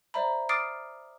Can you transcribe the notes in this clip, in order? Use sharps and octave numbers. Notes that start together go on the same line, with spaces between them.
C5 D5 E5 A#5 B5
D6 D#6 F6 A6 C7 D7